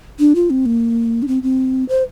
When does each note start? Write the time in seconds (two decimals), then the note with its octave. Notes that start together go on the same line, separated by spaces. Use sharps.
0.19 D4
0.35 F4
0.50 C4
0.66 A#3
1.22 D4
1.28 C4
1.43 C4
1.89 C5